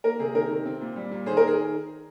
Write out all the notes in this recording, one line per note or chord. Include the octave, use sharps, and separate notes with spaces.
A#3 A#4
C3 G#4
D#3 A#4
C3
C4
A#2
G3
A#2
D#3 G#4 C5
A#4
D#3
G#4